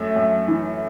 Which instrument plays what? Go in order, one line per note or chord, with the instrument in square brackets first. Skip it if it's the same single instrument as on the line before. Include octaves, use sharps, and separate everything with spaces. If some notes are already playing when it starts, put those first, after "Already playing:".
Already playing: [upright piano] F#2 A3 E5
F#2
E3